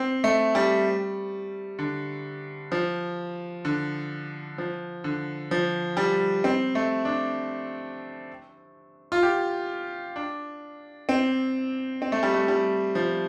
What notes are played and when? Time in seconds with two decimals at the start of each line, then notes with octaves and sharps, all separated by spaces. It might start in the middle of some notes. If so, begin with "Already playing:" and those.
Already playing: C4
0.24 A3
0.55 G3
1.79 D3
2.72 F3
3.65 D3
4.58 F3
5.04 D3
5.51 F3
5.97 G3
6.44 C4
6.75 A3
7.05 D4
9.12 F4
9.23 G4
10.16 D4
11.09 C4
12.02 C4
12.12 A3
12.23 G3
12.34 A3
12.48 G3
12.95 F3